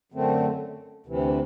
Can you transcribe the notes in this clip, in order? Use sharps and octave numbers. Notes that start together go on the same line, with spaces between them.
F#2 D3 A3 C4
D2 C3 E3